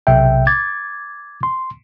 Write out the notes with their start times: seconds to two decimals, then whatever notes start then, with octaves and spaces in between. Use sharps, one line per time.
0.07 B1 C3 E5 G5
0.47 D6 G#6 A6
1.43 C6